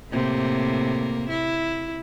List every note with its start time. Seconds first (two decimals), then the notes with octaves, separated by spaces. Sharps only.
0.11 A2 C3 A#3
1.30 E4